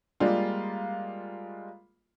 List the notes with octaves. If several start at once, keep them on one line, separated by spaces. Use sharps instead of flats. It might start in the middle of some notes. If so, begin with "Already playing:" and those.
G3 G#3 A#3 F4